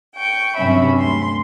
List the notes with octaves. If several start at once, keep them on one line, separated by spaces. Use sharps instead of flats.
G5 C#6
G2 C3 F#3 C#4 E5 B5
D2 C6